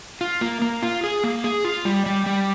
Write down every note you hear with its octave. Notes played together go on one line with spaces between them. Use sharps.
F4
A#3
A#3
F4
G#4
A#3
G#4
F4
G3
G3
G3